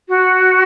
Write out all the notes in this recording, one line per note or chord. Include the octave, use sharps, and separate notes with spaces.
F#4